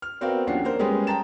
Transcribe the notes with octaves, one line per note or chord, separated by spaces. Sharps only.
F6
B3 C4 F#4 A#4 D5 F5
D#2 F3 C#4 D4 F#5 C7
A#3 A#4 C5
G3 G#3 C#4 G#4 B4
G5 A5 A#5 A6 E7